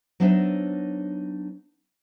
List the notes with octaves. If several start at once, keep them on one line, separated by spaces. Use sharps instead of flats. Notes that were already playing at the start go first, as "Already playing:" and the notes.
F#3 B3 D4 D#4 C5 E5